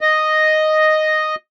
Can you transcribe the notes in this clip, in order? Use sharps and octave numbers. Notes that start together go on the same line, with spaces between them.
D#5